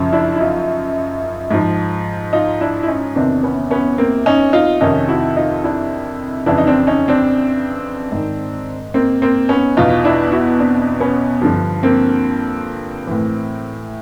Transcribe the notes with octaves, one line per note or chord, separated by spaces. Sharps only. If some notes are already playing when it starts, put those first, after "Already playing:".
Already playing: F#2 C#3 F3
D4 E4
E4
D#4 F4
G#2 F3
D#4 F4
D4 E4
E4
C#4 D#4
E2 C3 D#3 C4 D4
B3 C#4
B3 C#4
A#3 C4
C#4 D#4
D#4 F4
F2 C3 D#3 C#4 D#4
E4 F#4
D#4 F4
D4 E4
F2 C#3 E3 D4 E4
D#4
C4 D4
C#4 D#4
C4 D4
G#2 D#3
A#3 C4
A#3 C4
B3 C#4
E2 B2 D#4 F4
D4 E4
E4 F#4
C4 D4
B3 C#4
G2 D3 F3
A#3 C4
A2 E3